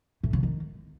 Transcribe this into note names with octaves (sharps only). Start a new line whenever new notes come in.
A2
C#3
D#3